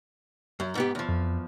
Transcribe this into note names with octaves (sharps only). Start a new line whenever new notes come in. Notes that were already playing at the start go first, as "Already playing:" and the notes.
F#2
G#2 B3 G4
E2 F3
F2